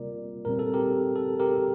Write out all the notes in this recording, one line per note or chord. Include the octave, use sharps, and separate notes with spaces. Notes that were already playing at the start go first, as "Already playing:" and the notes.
Already playing: C3 G3 A#3 F4 A#4 D5
A#2 G3 C4 A#4
A4
G4 A#4
A4
G4 A#4